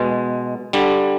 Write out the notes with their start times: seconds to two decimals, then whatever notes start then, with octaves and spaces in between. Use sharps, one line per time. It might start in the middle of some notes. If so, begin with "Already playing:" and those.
Already playing: B2 G#3
0.73 D3 G3